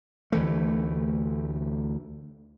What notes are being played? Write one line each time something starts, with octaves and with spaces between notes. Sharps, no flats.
D2 E3 A3